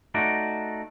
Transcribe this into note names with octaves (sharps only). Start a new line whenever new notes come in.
A3 D#4 F#4 D5